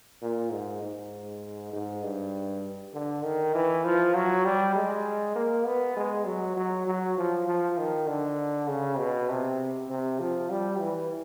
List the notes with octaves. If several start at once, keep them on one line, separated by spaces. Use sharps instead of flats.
A#2
G#2
G#2
G#2
G2
D3
D#3
E3
F3
F#3
G3
G#3
A#3
B3
G#3
F#3
F#3
F#3
F3
F3
D#3
D3
C#3
B2
C3
C3
F3
G3
E3